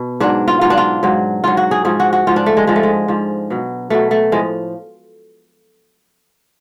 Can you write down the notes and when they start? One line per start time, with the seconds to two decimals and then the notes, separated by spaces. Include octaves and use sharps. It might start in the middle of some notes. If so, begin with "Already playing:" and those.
Already playing: B2
0.20 G#2 F#3 D4
0.48 F4
0.61 G#2 F#3 F4
0.70 D4
0.77 F4
1.03 G#2 F#3
1.44 G#2 F#3 F4
1.57 F#4
1.71 G#4
1.85 G#2 F3 G#4
2.00 F#4
2.13 F#4
2.27 G#2 F3 F4
2.36 D4
2.46 A3
2.57 G#3
2.67 G#2 F3 G#3
2.76 A3
2.83 G#3
3.08 G#2 F3
3.50 B2 F#3
3.90 B2 F#3 A3
4.11 A3
4.32 A2 F3 G#3